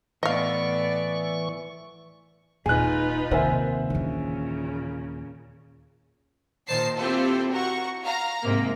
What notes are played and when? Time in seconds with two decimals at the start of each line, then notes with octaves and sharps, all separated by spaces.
0.23 A2 E3 B3 D5 D#5 F5 C#6
2.66 D#1 D#4 F4 G#4 B4 G#5 F#6
3.31 D#2 C3 A#4 C5 E5 F#5 G#5
3.90 A#2 C#3 E3 D4
6.67 A#2 D#3 C5 A5 C7
6.97 C4 E4 F4 G4 A4 C5
7.50 F#4 A#4 F#5 C#6
8.04 F5 A#5
8.43 G#2 C3 A#3